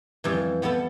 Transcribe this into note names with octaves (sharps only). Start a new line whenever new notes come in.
F2 E3 G3
G3 B3 E4 A4